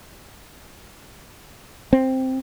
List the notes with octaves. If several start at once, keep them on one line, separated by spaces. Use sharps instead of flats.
C4